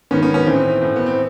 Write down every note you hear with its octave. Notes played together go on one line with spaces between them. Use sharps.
G#2 D#3 B3 C#4
B3 C#4
B3 C#4
A2 E3 C4
A2 E3
B3
C4